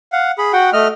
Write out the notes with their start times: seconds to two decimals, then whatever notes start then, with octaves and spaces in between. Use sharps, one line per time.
0.12 F5 F#5
0.38 G#4 B5
0.53 F#4 F#5 G5
0.73 A3 D#5 F6